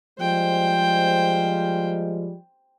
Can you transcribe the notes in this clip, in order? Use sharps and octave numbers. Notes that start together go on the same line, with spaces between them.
F3 G3 G#3 C5 G5